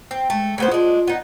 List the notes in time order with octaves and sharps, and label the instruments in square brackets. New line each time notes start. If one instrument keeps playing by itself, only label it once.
[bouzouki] C4
[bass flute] G#3 [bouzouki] A3
[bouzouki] C#3 B3 C5 [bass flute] A3
[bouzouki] G#3 D4 [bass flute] F4
[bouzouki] B3 D#4